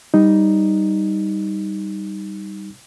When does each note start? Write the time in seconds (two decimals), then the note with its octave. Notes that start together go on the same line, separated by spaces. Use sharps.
0.14 G3 D#4